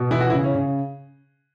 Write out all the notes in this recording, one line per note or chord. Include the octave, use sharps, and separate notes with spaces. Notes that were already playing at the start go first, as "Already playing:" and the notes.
Already playing: B2
E3 E4
F#4
E4
C#3
C#4
C#3